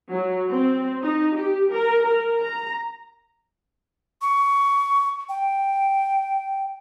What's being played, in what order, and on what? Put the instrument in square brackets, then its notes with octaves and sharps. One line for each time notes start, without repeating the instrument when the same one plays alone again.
[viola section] F#3
C4
D#4
G4
A#4
A#4
A#5
[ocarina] C#6
G5